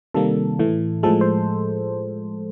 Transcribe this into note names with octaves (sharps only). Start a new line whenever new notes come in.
C3 D#3 G3 A#3 A4
A2 E3 A3
A2 F3 G#3 A4
C5